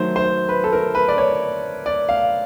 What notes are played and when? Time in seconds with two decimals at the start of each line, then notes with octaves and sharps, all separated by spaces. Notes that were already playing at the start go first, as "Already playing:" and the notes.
Already playing: D#3 F#3 A3 C5
0.16 C5
0.49 B4
0.64 A4
0.73 A#4
0.95 B4
1.08 D5
1.18 C#5
1.86 D5
2.09 F5